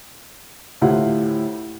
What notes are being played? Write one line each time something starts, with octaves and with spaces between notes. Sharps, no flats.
D2 A2 E4 F4 G4 F#5